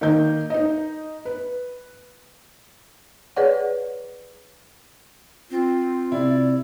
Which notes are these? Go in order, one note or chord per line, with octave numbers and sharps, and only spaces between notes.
D#3 A#3 D#4 G6
D#4 D#5
B4
G#4 B4 C#5 D5 F#5
C4 F4
C3 E4 D5